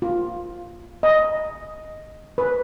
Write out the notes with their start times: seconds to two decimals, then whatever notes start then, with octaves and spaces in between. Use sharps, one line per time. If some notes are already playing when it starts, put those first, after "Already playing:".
0.02 F4
1.03 D#5
2.38 B4